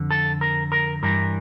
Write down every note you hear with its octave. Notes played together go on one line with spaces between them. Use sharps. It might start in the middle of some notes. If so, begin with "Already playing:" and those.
Already playing: F2 D3
A4
A#4
A#4
G2 E3 A#4